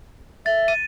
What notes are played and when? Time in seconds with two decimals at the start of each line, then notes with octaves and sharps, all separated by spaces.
0.46 E5 A6
0.68 D#7